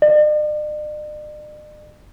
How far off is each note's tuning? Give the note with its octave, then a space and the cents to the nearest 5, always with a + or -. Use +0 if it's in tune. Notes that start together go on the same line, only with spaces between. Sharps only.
D5 +45